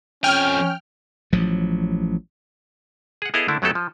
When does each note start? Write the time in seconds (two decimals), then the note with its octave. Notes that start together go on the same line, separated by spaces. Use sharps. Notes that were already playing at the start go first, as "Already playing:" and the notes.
0.24 F2 C#4 G5 G#5 F6
1.33 A1 F3 F#3
3.22 G#4 F#5
3.34 B3 E4 G#4 A4 D#5 F5
3.48 D3 A3 A#3 D4 E4
3.62 F#2 F#3 A3 B3 G4 A4
3.75 F3